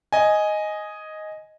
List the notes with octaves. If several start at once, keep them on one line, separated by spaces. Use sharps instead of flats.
D#5 G#5